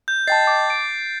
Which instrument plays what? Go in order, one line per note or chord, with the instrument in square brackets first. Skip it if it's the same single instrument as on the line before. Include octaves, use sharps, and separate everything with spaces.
[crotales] G6
[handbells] D#5 G5 A5 [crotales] A6 C7
[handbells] D6
D7